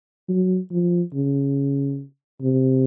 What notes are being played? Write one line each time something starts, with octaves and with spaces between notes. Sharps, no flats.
F#3
F3
C#3
C3